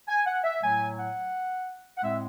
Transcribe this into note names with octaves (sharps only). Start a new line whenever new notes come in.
G#5
F#5
E5
A2 F#3 A3 G#5
F#5
F#5
A2 G#3 C4 E5